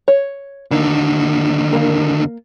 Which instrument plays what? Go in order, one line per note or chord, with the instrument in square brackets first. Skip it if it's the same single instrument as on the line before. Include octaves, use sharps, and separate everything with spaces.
[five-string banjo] C#5
[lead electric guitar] D#2 D3 [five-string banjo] A#3 D#4
[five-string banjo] A#3 A#4